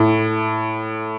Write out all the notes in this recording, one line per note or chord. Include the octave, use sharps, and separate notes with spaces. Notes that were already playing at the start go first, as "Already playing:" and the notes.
Already playing: A2